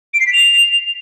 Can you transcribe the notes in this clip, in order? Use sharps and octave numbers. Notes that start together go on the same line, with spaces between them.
D7
C7
B6
F7